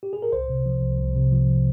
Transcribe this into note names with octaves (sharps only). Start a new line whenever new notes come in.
G4
G#4
A#4
C2 C5
C3
F3
C2
C2
C3
F3